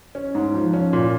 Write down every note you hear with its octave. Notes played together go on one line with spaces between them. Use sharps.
C#4
G#2
F3
C#4
A#2